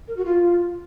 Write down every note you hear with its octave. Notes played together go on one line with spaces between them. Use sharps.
A#4
F#4
F4